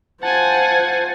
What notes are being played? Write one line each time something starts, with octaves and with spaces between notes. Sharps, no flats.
F4 C5 F#5 G#5 A5